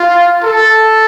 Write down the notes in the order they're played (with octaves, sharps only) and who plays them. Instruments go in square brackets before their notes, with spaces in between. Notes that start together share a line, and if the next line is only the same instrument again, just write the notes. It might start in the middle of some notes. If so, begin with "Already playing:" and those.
Already playing: [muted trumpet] F4
A4